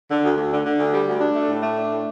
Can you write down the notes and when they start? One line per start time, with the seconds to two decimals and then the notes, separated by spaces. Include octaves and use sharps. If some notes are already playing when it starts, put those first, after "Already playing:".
0.10 D3
0.24 D2
0.37 D2
0.52 D3
0.65 D3
0.79 D2
0.94 G3
1.07 D2
1.21 D4
1.35 A3
1.49 A2
1.63 A3
1.77 D4
1.91 A2